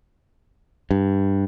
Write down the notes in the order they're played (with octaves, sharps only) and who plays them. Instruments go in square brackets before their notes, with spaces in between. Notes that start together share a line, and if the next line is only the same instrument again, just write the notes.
[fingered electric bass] G2